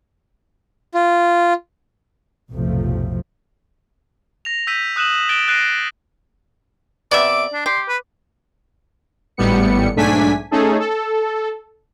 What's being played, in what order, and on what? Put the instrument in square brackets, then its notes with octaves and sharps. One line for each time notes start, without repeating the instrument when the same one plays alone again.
[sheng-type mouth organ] F4
[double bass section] B1 F2 A2 C3 F3 A3
[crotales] A#6 F7
E6 G6 B6 D#7
D#6 F#6 D#7 E7 F#7
F#6 A6 B6 D7 E7 G7
F#6 A6 A#6 C7 D7 D#7
[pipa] C3 B3 E5 [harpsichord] D5 [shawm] D6
[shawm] D4
[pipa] G4 [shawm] C6
[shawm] B4
[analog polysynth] G#1 A2 G3 B3 C#7
B1 G#2 A3 D4 G#5 B6
A3 C#4 D#4 G#4 A4
A4